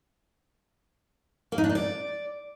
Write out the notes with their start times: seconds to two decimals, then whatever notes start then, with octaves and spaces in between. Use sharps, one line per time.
1.52 A#3
1.58 D#4
1.64 D4
1.69 D#4
1.75 D5